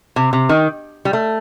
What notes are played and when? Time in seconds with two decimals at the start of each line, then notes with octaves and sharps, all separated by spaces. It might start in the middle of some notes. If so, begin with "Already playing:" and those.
0.16 C3
0.33 C3
0.49 D#3
1.05 G3
1.13 A3